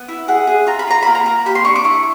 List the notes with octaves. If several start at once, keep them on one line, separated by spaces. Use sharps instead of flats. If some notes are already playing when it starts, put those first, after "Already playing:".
Already playing: B3
E4
G#4 F#5
G#4
F4 A#5
B5
F4 A#5
A#3 B5
A#5
A#3
G4 B5
C6
D4 C#6
D6
E4 C#6